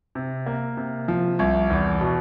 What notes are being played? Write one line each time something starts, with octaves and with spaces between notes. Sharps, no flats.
C3
A#3
C3
F3
C2
E2
B2